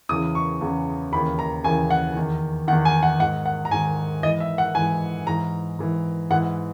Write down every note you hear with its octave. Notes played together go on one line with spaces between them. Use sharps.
E2 C#3 E3 D#6
C#6
E2 C#3 E3
D#2 C#3 E3 B5
A#5
D#2 C#3 E3 G#5
F#5
E2 D#3
E2 D#3 F#5
G#5
F#5
G#2 D#3 F#5
F#5
A#5
G#2 D#3 G#5
G#2 E3 D#5
E5
F#5
G#2 E3 G#5
G#2 E3 A#5
G#2 E3
G#2 E3 F#5